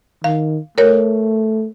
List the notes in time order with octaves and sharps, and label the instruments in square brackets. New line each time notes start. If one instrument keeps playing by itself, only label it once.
[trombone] D#3 [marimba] F5
[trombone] A3 [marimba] A#4 C#5